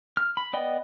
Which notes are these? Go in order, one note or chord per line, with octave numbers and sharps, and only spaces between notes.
F6
B5
B3 D5 D#5 G5